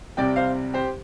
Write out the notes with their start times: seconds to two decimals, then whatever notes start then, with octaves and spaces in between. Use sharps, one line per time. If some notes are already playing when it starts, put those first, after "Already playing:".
0.17 C2 C3 G3 C4 D5 G5
0.36 C5 F5
0.74 G4 C5